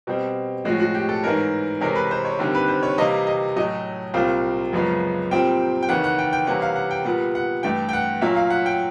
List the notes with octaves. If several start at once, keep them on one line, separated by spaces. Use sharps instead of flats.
B2 G3 C4
A2 F3 G#3 C#4 F#4
F#4
G4
A4
G#2 E3 G#3 C#4 A#4
C3 E3 G#3 C#4 A#4
B4
C5
C#5
D#2 D3 G3 C4
B4
C5
C#5
C3 E3 G3 A#3 D#5
D#5
A2 F#3 A3 C#4 D#5
C2 A#2 G3 C4 F5
F#2 C#3 F3 G#3 B3
A#2 G3 C4 G5
G5
D#2 C#3 E3 F#5
F#5
G5
G5
C3 E3 G3 A#3 C#4 F#5
F5
F#5
G5
A#2 G3 B3 F#5
F#5
G2 E3 A3 G5
G5
F#5
A#2 F#3 A#3 C#4 E5
F5
F#5
G5